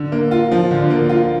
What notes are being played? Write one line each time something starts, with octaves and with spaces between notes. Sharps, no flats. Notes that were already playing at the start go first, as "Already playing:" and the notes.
Already playing: D3
A#3
F4
F3
D3
A#3
F4